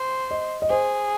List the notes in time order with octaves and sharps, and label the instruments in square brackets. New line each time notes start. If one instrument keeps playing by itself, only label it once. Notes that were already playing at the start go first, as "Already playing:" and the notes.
Already playing: [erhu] C5
[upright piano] D#5
D#5
[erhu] G#4 [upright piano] C5